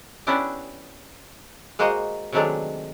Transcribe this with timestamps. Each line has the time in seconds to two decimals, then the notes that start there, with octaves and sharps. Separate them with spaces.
0.27 B3 C#4 D4 E4 G4
1.79 G#3 A#3 F#4 C5 D#5
2.32 C3 D#3 F#3 G#3 A3 D4